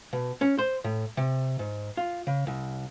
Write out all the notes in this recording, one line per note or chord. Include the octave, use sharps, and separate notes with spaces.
B2
C#4
C5
A2
C3
G#2
F4
C#3
C2